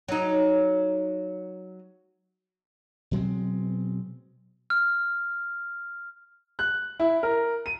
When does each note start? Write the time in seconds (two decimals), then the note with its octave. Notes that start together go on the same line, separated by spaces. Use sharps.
0.08 F#3 D#4
3.11 B2 F#3 G#3 C4
4.70 F6
6.59 F#6
7.00 E4
7.23 A#4
7.66 D#7